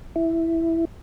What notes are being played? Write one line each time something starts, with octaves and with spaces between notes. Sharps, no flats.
E4